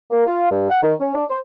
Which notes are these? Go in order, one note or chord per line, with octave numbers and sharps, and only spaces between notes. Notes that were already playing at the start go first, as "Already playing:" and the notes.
A#3
F4
G2
F#5
D#3
C#4
D4
C5